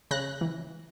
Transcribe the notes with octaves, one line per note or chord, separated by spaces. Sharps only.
C#3 F#6 A#6
E3